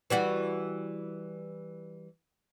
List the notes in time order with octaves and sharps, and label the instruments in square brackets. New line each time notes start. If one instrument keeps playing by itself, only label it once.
[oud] E3 G3 F#4